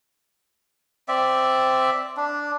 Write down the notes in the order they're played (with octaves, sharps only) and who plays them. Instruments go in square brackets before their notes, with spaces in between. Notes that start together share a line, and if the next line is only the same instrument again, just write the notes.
[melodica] C4 D5 E5
D4